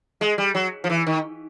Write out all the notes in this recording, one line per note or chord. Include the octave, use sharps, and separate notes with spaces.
G#3
G3
F#3
F3
E3
D#3